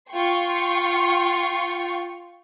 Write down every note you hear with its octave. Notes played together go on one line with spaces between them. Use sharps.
F4 G5 C6 C#6